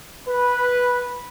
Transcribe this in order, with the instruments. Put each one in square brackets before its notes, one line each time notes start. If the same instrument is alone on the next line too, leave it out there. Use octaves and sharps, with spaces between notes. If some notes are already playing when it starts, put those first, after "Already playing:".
[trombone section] B4